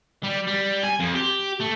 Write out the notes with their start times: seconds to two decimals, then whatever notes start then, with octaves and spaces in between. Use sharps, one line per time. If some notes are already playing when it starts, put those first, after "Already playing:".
0.23 G3
0.47 G3
0.84 G#5
1.00 F2
1.15 G4
1.61 A3